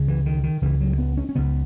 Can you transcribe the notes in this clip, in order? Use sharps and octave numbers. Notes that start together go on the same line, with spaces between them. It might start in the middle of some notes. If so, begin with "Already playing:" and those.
Already playing: C#2 C#3
E3
D#3
D#3
C#2 C#3 E3
F#3
B3
C#4
C#4
C#2 C#3 B3